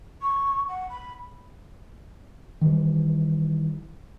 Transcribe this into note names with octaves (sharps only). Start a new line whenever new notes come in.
C#6
F#5
B5
D#3 E3 G3